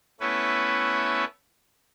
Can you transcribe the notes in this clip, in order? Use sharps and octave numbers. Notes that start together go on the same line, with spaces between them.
A3 B3 C#4 E4 B4 C#5